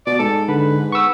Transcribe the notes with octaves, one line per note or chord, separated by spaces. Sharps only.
B2 D5
G#2 A4
D3 B4
B3 C#6 E6